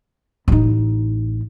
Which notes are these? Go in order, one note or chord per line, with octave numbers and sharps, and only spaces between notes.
A1 D#4